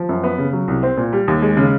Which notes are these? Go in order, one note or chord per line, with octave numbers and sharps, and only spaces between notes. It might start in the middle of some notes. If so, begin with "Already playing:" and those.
Already playing: F3
F#2
B3
C#3
F#3
C2
C4
A#2
G3
D#2
G#3
C#3